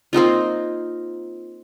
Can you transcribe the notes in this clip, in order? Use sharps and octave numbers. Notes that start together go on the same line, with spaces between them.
A#3 C4 D#4 F4